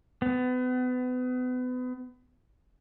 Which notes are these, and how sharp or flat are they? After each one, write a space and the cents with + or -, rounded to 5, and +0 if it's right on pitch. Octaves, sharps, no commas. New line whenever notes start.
B3 +35